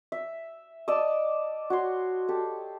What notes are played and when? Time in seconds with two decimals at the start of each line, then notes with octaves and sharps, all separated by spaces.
0.12 E5
0.88 D5 D#5 A5 E6
1.70 F#4 C#5 C6
2.28 G4 A4